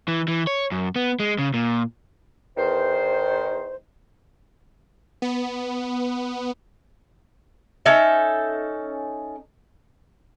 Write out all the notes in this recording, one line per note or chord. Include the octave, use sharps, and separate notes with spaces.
E3
E3
C#5
F#2
B3
G#3
C#3
A#2
E2 D#3 C5
B3
C#4 D#4 A4 E5